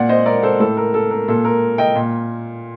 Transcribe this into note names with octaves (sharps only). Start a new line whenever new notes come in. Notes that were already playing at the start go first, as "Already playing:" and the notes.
Already playing: A#2 D5 F#5
C5 D#5
A#4 D5
A4 C5
A2 A4
A#4
A4
A#4
A#2 A4
A#4
D#5 G5
A#2